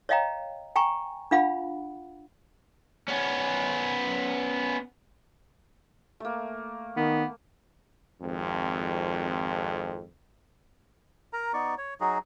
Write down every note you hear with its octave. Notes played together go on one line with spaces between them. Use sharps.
C#5 D#5 F5 G5 A#5
G5 G#5 A#5 C#6
D4 F4 F5 F#5 B5
B3 C#4
A3 A#3
D#3 B3
G#1 F2
A#4 A#5
B3 D#4 D5 C#6
C#5
F#3 D#4 F#4 G#4